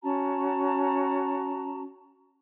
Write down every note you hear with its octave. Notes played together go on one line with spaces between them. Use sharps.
C#4 F#4 A5 A#5